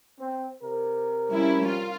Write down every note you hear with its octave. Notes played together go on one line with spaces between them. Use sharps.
C4
C3 A#4
G3 C#4 E4
F4